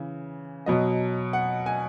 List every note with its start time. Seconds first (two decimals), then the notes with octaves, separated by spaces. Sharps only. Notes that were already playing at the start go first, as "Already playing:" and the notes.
Already playing: C#3 E3
0.66 B2 F#3 D#5
1.33 F#5
1.66 G#5